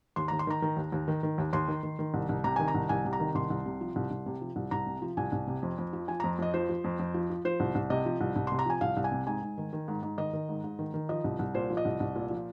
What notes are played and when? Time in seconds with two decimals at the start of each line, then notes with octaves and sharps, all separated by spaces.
0.16 D#2 C6
0.28 A#5
0.32 D#2
0.39 C6
0.47 D#3 A#5
0.62 D#3
0.77 D#2
0.92 D#2
1.08 D#3
1.23 D#3
1.38 D#2
1.53 D#2 C6
1.68 D#3
1.83 D#3
1.99 D#3
2.14 C2
2.29 C2
2.44 C3 A#5
2.56 D#3 G#5
2.68 A#5
2.75 C2
2.89 C2 G#5
3.05 C3
3.13 A#5
3.20 D#3
3.35 C2 C6
3.50 C2
3.66 C3
3.81 F3
3.96 C2
4.11 C2
4.26 C3
4.42 F3
4.56 C2
4.71 C2 A#5
4.87 C3
5.02 F3
5.17 C2 G#5
5.32 C2
5.47 C3
5.63 F2
5.78 F2
5.93 F3
6.08 F3 G#5
6.20 A#5
6.24 F2
6.39 F2 D#5
6.54 F3 C5
6.69 F3
6.84 F2
6.99 F2
7.14 F3
7.30 F3
7.45 F3 C5
7.60 C2
7.75 C2
7.90 C3 D#5
8.06 F3
8.21 C2
8.36 C2
8.47 C3 C6
8.59 A#5
8.66 F3 G#5
8.81 C2 F5
8.97 C2
9.04 G#5
9.12 C3
9.27 G#2 G#5
9.42 G#2
9.58 D#3
9.73 D#3
9.88 G#2
10.03 G#2
10.18 D#3 D#5
10.33 D#3
10.49 G#2
10.64 G#2
10.79 D#3
10.94 D#3
11.09 F3 D#5
11.24 C2
11.39 C2
11.54 A#2 C5
11.70 F3
11.77 D#5
11.85 C2
12.00 C2
12.15 A#2
12.31 F3